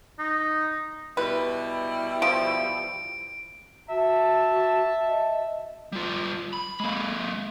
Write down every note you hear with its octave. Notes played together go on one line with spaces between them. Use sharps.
D#4
B2 G3 E4 B4
F3 D7
F#4 E5 A5
D#5
G3 F4
B5
G#3 A#3